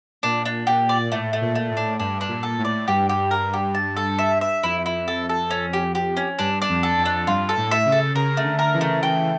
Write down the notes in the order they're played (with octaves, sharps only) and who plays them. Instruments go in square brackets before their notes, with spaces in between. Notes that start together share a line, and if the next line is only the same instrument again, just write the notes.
[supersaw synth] A#2 [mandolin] D4
[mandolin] D4
[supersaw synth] A#2 [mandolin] G4
[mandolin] D5
[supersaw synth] A2 [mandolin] A3
[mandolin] A3
[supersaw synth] A#2
[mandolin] A3
[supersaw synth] A2
[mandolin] D4
[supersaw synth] G2 [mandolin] D4
[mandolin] D4
[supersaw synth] A#2
[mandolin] A4
[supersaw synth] A2
[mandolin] D5
[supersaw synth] G2 [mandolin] G4
[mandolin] G4
A#4
G4
A5
A4
E5
E5
[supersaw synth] F2 [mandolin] E4
[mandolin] E4
A4
A4
C#4
G4
G4
C#4
[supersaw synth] G2 [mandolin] D4
[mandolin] D4
[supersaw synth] F2
[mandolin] A4
[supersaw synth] F2
[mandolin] D4
[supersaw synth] G2 [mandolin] F4
[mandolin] A4
[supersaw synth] A2
[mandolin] E5
[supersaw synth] C#3
[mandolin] A4
[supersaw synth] C#3 [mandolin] A#4
[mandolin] A3
[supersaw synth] D3
[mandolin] A#4
[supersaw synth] C#3 E3
[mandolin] A3
[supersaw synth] C#3 E3 [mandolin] G5